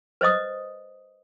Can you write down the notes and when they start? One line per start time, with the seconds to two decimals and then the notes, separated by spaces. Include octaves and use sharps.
0.21 B4 C5 D#5 D#6